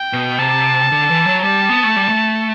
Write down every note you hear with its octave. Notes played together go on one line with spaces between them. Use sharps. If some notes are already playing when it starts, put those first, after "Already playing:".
Already playing: G5
B2
C3 A5
D3
E3
F#3
G3 A5
B3
A3
G3
A3